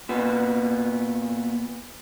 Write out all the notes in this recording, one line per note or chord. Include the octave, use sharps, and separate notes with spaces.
A#2 B3